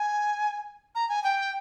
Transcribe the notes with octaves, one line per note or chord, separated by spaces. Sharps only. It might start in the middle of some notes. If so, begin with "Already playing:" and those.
Already playing: G#5
A#5
G#5
G5